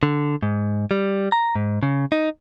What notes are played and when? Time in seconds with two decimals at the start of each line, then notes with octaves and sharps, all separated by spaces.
0.03 D3
0.43 G#2
0.91 G3
1.32 A#5
1.55 G#2
1.83 C#3
2.12 D#4